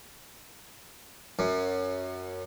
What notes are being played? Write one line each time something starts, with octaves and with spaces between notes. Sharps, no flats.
F#2